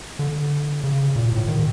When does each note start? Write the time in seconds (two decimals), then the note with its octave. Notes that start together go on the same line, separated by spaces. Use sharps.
0.19 D3
0.84 C#3
1.16 A#2
1.32 A2
1.48 D#3